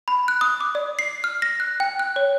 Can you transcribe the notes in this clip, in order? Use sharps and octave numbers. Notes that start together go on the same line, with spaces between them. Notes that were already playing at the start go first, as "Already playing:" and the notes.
B5
F#6
D#6
D6
D5
C7
F6
A#6
F#6
G5
F#6
C#5